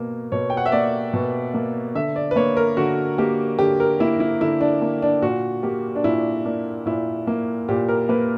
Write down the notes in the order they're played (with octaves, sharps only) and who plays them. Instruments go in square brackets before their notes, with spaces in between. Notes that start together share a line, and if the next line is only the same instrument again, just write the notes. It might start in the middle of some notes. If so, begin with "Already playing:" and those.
Already playing: [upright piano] B2 A#3
B2 C#5
G5
F#5
E5
A#3 D5
B2
A#3
D3 E5
D5
B4
A#3 C#5
A#4
D3 F#4
A#3 G4
D3 G4
A#4
A#3 E4
E4
D3 E4
D4
A#3
D4
A#2 F#4
A#3 G4
D4
A#2 E4
A#3 D4
A#2 E4
A#3
A#2 G4
A#4
A#3 B4